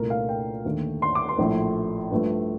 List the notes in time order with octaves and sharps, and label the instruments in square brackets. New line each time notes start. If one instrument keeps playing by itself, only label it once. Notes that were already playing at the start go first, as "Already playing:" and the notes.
Already playing: [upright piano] C2 A#2 A3 A#4
F5
G5
D#2 D3 A3
C6
D6
C6
A#1 A2 A3
G2 F3 A3